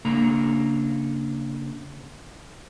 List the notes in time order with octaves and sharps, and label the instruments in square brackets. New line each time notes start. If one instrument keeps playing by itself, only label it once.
[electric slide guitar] C#3 A#3 D4 A4 A#5